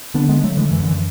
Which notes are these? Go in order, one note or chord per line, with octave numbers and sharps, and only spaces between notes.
D3 B3 D4
G#3 B3
D3 F#3 A3
E3 G#3
F#2 E3
D3
E3